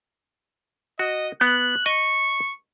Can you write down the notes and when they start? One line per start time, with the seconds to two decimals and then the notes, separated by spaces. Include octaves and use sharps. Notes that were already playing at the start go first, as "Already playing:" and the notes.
0.99 F#4 D#5
1.41 B3 F#6
1.86 D#5 C#6